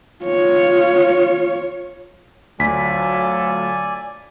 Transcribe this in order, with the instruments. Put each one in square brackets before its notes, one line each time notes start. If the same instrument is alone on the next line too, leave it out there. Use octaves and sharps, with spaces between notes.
[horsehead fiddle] F4 C#5
[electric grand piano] D2 B6 [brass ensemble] F#3 F4 A4 [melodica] D5 G#5